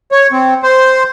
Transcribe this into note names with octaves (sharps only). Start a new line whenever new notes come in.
C#5
C4
C5